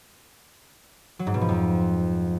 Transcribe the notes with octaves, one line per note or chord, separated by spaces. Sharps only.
F#3
G#2
B2
F3
F2